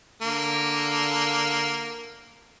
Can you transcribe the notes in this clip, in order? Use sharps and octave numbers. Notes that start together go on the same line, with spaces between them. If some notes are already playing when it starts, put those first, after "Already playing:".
D3 A#3